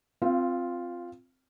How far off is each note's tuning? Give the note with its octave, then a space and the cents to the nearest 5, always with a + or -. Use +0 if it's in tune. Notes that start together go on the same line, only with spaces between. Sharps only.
C4 -5 F4 +0 F5 -30